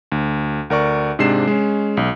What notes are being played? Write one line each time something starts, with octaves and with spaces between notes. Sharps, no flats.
D2
D2 A#4 D5 C#6
G#2 C3 G#3 D4 C7 E7
G#3 C#4
B1